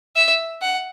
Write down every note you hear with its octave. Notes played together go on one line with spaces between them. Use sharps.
E5
F#5